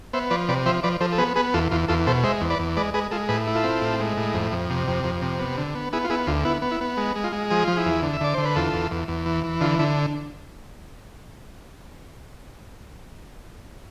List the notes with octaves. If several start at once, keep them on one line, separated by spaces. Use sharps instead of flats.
B3 C5 E5
F3 B4 D5
C3 B4 D5
F3 C5 E5
F3 B4 D5
F3 A4 C5
A4
B3 G#4 B4
B3 G#4 B4
E2 F4 A4
E2 F4
E2 F4 A4
B2 A4 C5
G#3 C5 E5
E2
B4 D5
E2
G#3 B4 D5
G#3 G#4 B4
G#3 F4 A4
A2 G#4 B4
E4
F4 A4
C4
A2
G#3
A2
F2
F2
C3
F2
F2
C3
B3
D3
B3
B3 E4 G#4
F4
B3 E4 G#4
D2 F4
B3 E4
B3
E4
B3
G#3
G#3
F4
G#3
F3 G#4
F3 F4
E4 G#4
E2
D3
E5
D3 D5
D3 C5
B4
E2 F4 A4
E2
E2
E2
E3
E3
D3 F4
D3 E4